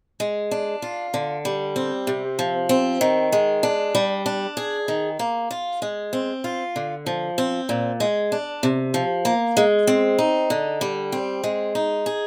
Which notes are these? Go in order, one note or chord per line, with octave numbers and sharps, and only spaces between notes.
G#3
D4
F4
D3
G3
C4
C3
F3
C4
D#3
G#3
D4
G3
D4
G#4
D#3
A#3
F4
G#3
C4
F4
D3
F3
C4
A#2
G#3
D4
C3
F3
A#3
G#3
C4
D#4
D3
G3
C4
G#3
D#4
G#4